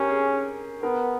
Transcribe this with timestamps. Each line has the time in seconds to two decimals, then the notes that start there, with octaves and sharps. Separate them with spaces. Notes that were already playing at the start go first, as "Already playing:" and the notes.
Already playing: C#4 G4 A#4
0.09 G#4
0.83 B3 A#4